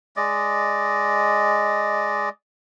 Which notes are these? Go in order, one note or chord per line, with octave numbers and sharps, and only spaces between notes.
G#3 D5 D#5